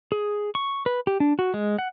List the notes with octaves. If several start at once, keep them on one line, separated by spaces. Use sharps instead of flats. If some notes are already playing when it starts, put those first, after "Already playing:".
G#4
C#6
B4
G4
D4
F#4
G#3
F#5